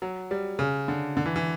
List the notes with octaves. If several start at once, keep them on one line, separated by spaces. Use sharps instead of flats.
F#3
G3
C#3
D3
D3
E3
E3